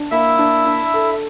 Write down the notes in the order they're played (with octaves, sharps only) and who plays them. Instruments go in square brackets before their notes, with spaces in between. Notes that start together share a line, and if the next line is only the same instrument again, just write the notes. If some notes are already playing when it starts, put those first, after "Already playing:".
Already playing: [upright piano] D4
[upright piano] A#3 [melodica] E4 E5
[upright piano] D4
D4
A4